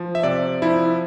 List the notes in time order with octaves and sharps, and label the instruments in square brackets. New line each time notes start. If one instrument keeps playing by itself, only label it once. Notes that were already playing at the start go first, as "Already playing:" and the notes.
Already playing: [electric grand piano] F3
E5
C3 D5
F3 E4